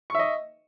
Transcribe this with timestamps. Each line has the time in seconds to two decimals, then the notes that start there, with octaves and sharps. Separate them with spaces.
0.10 C#6
0.15 E5
0.19 D#5